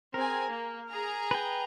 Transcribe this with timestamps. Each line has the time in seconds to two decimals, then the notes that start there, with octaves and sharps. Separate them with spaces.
0.14 C4 G#4 A#4 G#5
0.50 A#3
0.90 G#4 A#5
1.31 B4 G5